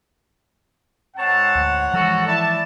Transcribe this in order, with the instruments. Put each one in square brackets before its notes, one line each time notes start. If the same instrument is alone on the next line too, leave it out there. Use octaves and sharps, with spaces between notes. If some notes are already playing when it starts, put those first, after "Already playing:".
[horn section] G#2 C#5 F#5 [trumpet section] C4 A5
[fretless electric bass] D2
[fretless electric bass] E3 F3 G#3 [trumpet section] F#4 A4
[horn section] E4 D5 [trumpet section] A5